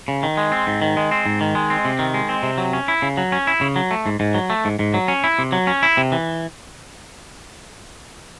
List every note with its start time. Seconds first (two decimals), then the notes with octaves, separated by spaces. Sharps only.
0.08 C#3
0.23 D#3
0.37 G#3
0.52 C4
0.67 G#2
0.82 D#3
0.97 G#3
1.11 C4
1.26 G#2
1.41 D#3
1.55 G#3
1.70 C4
1.85 C3
1.99 D#3
2.14 G#3
2.29 C4
2.43 C3
2.58 F#3
2.73 C#4
2.88 E4
3.02 C#3
3.17 F#3
3.32 C#4
3.47 E4
3.61 C#3
3.76 F#3
3.91 A3
4.06 G#2
4.20 G#2
4.35 F#3
4.50 A3
4.65 G#2
4.79 G#2
4.94 F#3
5.08 C#4
5.24 E4
5.39 C3
5.52 F#3
5.67 C#4
5.83 E4
5.97 C3
6.12 E3